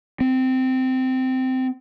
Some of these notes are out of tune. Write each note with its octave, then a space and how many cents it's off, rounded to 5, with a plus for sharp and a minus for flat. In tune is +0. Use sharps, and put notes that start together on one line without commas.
C4 -15